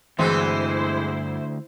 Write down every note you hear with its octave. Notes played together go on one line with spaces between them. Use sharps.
D2 G2 E3 G#3 C4 E4 C5